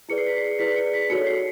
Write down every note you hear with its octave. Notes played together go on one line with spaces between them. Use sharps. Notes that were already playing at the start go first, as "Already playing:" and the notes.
E4 G#4 B4 D5 C#7
C7
B6
C7
E4 G#4 B4 D5 B6
C#7
B6
D#4 F#4 A4 C#5 C#7
C7